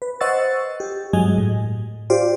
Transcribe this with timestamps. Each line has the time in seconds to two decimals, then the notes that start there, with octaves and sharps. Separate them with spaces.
0.02 B4
0.21 C5 D#5 F#5 C#6 E6 A6
0.80 G4
1.13 G2 F#3 G#3 D#5 G#5
1.38 A2
2.10 F4 G4 C5 D5